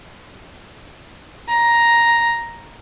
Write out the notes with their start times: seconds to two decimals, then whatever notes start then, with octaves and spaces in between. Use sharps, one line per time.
1.48 A#5